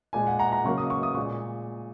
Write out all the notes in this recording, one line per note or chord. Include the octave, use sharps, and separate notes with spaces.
A#2 G#3 G#5
F#5
F#5 A#5
F#5 A#5
C#3 F#3 A#3 C#6
D#6
C#6
D#6
A#2 G#3 C#6